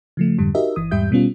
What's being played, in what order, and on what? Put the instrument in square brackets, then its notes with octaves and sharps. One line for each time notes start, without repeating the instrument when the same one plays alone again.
[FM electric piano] C#3 F3 A3
F2 G#2 D3 G3
D#4 F#4 G4 A#4 D#5 E5
G1 E3 D#6
E2 G#2 G3 G4 E5 G6
B2 G3 B3 C#4 F4